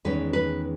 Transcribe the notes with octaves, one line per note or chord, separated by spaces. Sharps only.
E2 D#3 G#3 C#4 B4
B4